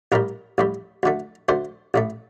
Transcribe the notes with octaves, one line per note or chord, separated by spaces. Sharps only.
A1 A2 G3 A#4
A1 A2 G3
D2 D3 A3
D2 D3 A3 C5
A1 A2 A3